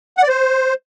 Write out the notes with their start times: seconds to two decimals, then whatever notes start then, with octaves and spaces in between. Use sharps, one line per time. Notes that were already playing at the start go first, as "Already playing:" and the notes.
0.18 F#5
0.23 D5
0.28 C5